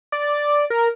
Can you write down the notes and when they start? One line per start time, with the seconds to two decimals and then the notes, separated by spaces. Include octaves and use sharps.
0.12 D5
0.70 A#4